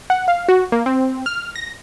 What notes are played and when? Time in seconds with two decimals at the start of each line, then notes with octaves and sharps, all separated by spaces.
0.10 F#5
0.28 F5
0.49 F#4
0.72 A#3
0.86 C4
1.26 F6
1.56 A#6